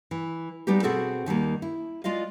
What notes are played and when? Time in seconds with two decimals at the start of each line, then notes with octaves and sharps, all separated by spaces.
0.11 E3
0.67 G3 G#3 B3 D#4 G4
0.83 B2 C4 F#4 G#4 A4
1.26 D#2 D#3 G3 A#3
1.62 E4
2.04 G#3 F4 D5 D#5 F5